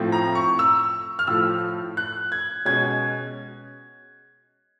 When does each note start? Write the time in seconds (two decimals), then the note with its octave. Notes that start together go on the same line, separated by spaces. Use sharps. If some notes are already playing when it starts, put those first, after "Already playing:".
Already playing: A2 F3 A3 C4
0.12 A#5
0.35 C#6
0.59 E6
1.19 F6
1.27 A2 F3 A3 E6
1.97 F#6
2.32 G#6
2.65 B2 G#3 C#4 G#6